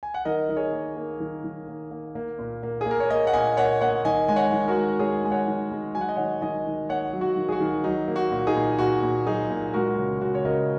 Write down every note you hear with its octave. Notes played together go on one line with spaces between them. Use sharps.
G#5
F#5
D#3 A#4 D#5
D#3 D#5
G#4 C#5
A#3
A#3
D#3
D#3
A#3
A#3
A#3
A#2
A#3
G#4
A#3 A#4
C#5
A#3 A#4 D#5
F#5
A#2 D#5 G#5
A#3 C#5 F#5
A#3 C#5 F#5
D#3 D#5 G#5
G#3 G#5
C#5 F#5
D#3
F#4 A#4
G#3
G#3 G#4 C#5
G#3 G#5
C#5 F#5
D#3
G#3
F#3 G#5
F#5
D#5
D#3 C#5 F#5
D#3 D#5 G#5
D#3
A#3 C#5 F#5
F#3
F#4
D#3
G#4
F#4
D#3
F#3 D#4
A#3
F#4
A#2
D#4 G#4
A#2
A#2 F#4
A#2
F#3 D#4 G#4
A#2
G#3 F#4 A#4
C#3
C#3 F#4
C#5
C#3 A#4 D#5